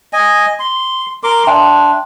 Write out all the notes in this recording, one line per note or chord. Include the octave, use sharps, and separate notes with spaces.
D#5 G#5
C6
A#4 C6 D6
D4 E5 G5 C6